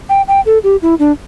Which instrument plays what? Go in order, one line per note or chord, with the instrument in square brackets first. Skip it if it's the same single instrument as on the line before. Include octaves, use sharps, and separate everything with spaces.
[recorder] G5
G5
A4
G4
E4
D4